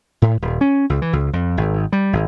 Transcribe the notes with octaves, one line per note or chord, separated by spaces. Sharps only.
A2
D#1
C#4
C#2
E3
C#2
F2
G#1
G3
G#1